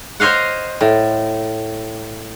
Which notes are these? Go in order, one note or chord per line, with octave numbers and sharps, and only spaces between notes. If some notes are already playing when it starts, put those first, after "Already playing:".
C5 C#5 D#5 F5 F#5
A2